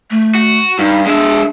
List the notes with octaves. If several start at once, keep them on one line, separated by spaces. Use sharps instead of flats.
A3
F#4
G2 D#4
G#3 D4 E5